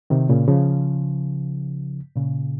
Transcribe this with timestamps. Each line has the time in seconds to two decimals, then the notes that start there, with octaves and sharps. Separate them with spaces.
0.10 C3 D#3
0.29 A#2 C#3
0.48 C#3 F3
2.16 A#2 C#3